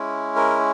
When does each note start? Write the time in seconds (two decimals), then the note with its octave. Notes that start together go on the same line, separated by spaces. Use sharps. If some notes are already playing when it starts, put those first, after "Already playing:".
Already playing: G#3 C#4 E4
0.36 A#4